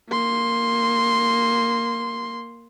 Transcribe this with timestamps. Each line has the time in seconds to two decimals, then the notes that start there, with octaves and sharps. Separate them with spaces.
0.10 A#3 C6